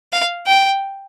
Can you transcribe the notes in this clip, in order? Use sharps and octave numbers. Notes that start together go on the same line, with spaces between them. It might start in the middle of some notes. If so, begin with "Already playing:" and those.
F5
G5